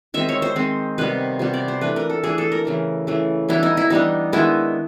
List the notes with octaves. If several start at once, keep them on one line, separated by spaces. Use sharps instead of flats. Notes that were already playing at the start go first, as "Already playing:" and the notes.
D#3 G#3 C4 E5
C#5
C5
D#3 G#3 C4
C3 D#3 G3 B3 B4
C3 D#3 G3 B3
D5
C5
E3 A3 D4 B4
A#4
A4
E3 A3 D4 G#4
A4
A#4
C#3 E3 A3
C#3 E3 A3
E3 G3 B3 D4 E4
D#4
E4
E3 G3 B3 D4 D#4
D#3 G#3 B3 D4 E4